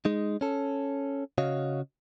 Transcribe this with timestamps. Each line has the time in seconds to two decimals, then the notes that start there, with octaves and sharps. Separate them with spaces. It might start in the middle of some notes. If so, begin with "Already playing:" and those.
0.05 G#3 D#4
0.41 C#4 A4
1.38 C#3 F#4 C#5 D#5 F5